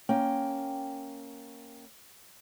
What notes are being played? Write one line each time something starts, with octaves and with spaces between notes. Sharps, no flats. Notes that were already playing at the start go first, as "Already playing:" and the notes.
A#3 C#4 G5